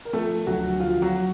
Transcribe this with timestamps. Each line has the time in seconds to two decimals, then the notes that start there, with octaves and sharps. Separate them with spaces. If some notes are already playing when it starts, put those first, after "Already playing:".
0.05 A#4
0.13 F3 A3 A4
0.47 D2 F#3 F#4
0.80 F3 F4
1.02 F#3 F#4